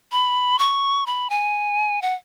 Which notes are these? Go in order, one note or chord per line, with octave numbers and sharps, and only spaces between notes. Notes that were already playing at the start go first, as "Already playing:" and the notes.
B5
C#6
B5
G#5
F#5